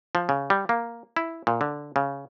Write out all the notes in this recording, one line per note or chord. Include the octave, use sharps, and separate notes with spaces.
F3
C#3
G3
A#3
E4
A#2
D3
C#3